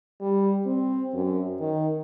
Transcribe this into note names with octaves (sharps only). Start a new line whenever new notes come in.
G3
C4
F#2
D#3